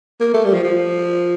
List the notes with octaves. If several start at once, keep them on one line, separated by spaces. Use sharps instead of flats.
A#3
A3
G3
F3
F3